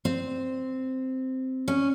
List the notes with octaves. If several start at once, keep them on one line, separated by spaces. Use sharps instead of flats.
C4
C#4